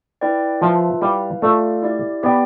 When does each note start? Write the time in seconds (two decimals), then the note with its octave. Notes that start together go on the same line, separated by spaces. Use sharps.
0.21 E4 B4 D5 G5
0.61 F3 F4 B4 E5 A5
1.01 G3 E4 B4 F5
1.42 A3 F4 A4 D5 F5
1.83 E4 G4 D5
2.23 B3 G4 D5 G5